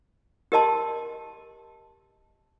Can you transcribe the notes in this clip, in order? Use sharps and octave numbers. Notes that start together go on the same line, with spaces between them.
G4 A#4 D#5 A5 C6